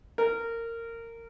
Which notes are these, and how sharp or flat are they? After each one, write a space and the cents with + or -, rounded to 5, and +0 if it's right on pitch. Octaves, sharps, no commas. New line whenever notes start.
A#4 -20